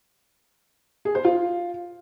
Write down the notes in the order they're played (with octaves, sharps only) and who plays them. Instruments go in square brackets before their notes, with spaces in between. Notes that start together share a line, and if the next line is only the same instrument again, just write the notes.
[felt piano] G#4
C5
F4